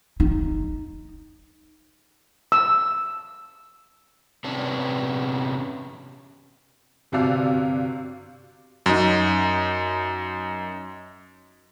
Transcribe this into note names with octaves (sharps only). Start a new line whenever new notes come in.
D#4
E6
C3 B3 C#4 D4
G1 C3 F#4 D5 F5 E6
F#2 D#4